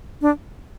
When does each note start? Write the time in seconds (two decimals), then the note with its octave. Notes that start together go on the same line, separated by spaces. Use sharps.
0.21 D4